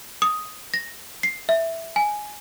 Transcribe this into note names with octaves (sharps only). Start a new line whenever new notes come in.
D#6
A#6
C7
E5
G#5